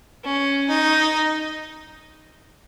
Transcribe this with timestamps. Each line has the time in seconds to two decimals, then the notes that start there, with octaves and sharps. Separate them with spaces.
0.24 C#4
0.69 D#4